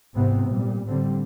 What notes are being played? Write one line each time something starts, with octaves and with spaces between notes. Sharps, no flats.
G#1 G#2 C3 E3 B3 C4
A#2 G3
A2 D3 G3 C4